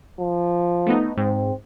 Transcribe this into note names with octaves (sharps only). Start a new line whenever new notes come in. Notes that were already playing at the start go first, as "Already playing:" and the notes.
F3
A3 B3 D#4
G#2 C4